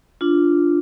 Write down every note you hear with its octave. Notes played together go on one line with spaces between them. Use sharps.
D4 F4